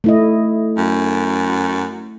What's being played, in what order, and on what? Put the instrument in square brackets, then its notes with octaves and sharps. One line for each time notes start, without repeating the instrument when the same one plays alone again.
[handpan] A3 E4 D#5
[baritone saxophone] F#2